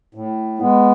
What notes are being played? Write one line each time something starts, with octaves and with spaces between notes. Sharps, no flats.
A2
G#3 B3